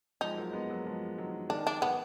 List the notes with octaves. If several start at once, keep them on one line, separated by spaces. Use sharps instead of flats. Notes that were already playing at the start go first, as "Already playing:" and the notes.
F3 G#3 D#4
F#3 A#3
G#3 B3
F#3 A#3
F3 G#3
D#3 F#3
D#3 D4
D4
D#3 B3